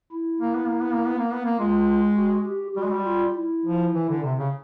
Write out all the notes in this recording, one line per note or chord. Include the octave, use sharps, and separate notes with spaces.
E4
A#3
B3
A#3
B3
A#3
B3
A#3
B3
A#3
G#3 F4
F#4
G4
G3 F#4
G#3
G3
F4
E4
F3
E3
D3
C3
C#3